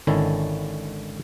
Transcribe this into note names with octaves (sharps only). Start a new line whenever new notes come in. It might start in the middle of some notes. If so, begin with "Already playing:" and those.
G#1 D3 D#3 C#4 E4 A4